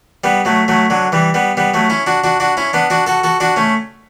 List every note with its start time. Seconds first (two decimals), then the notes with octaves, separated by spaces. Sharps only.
0.24 G3 B3
0.45 F#3 A3
0.68 F#3 A3
0.90 D3 F#3
1.12 E3 G3
1.34 G3 B3
1.57 G3 B3
1.74 F#3 A3
1.90 C#4 E4
2.06 D4 F#4
2.24 D4 F#4
2.40 D4 F#4
2.57 C#4 E4
2.73 B3 D4
2.90 D4 F#4
3.07 F#4 A4
3.24 F#4 A4
3.40 D4 F#4
3.56 A3 C#4